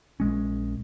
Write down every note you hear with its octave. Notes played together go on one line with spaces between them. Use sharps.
A#1 G#3 C#4